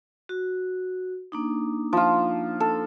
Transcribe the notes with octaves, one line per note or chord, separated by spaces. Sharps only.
F#4
A#3 D4 D#4
F3 F4
A4